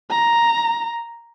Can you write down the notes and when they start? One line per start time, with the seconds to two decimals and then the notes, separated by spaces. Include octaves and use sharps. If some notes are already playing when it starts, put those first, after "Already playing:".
0.10 A#5